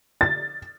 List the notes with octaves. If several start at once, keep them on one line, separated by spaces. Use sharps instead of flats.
A6